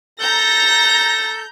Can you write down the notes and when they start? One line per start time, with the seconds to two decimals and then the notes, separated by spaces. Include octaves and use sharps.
0.21 A4 A#5 G6 A#6